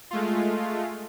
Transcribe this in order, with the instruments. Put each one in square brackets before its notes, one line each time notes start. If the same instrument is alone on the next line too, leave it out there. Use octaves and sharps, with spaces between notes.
[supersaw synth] G#3 A3 F4